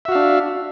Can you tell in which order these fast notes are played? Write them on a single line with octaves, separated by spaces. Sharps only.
E5 F#4 F5 D4